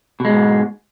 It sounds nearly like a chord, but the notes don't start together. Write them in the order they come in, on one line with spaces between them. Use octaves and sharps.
B2 G#3 G#2